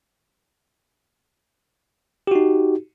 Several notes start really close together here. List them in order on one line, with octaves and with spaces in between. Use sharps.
G4 F#4 D#4